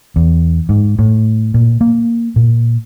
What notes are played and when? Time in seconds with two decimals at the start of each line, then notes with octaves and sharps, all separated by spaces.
0.16 E2
0.69 G#2
0.99 A2
1.54 A#2
1.81 A#3
2.36 A#2